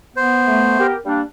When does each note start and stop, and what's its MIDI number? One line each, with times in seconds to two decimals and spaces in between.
0.16 0.94 59
0.16 0.87 72
0.47 0.78 57
0.80 0.96 67
0.80 0.96 70
1.06 1.21 55
1.06 1.21 58
1.06 1.21 62